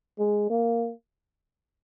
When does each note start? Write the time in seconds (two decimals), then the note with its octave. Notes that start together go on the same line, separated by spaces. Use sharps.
0.19 G#3
0.50 A#3